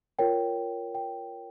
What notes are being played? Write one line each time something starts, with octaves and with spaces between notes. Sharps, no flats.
F4 A#4 C#5 G5
G5